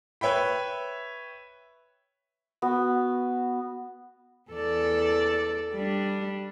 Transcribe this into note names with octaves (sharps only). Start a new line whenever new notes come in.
B4 C#5 E5 G5 B5
B3 F#4
E2 A4 D5
G3 D4